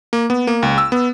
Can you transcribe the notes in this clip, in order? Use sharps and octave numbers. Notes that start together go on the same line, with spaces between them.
A#3
B3
A#3
C#2
E6
B3